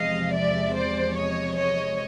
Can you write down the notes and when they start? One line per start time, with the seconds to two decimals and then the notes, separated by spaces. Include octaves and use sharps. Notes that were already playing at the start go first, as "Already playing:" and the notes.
Already playing: E2 C3 F3 G#3 D#5 F5
0.33 D5 E5
0.75 C5 D5
1.16 C#5 D#5
1.58 C#5 D#5